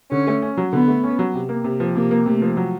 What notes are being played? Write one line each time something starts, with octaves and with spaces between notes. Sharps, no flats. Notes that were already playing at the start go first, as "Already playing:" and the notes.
D3 C#4
A3
C#4
F#3
D3 B3
A3
C#4
F#3
C3
A#3
C3
F3
C3 A#3
A#3
C3 A3
F3
F#3